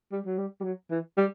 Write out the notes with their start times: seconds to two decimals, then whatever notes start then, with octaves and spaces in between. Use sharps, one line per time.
0.12 G3
0.26 F#3
0.38 G3
0.60 G3
0.64 F#3
0.91 E3
1.18 G3